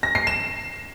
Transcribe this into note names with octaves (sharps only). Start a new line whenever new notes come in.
A#6
C7
E7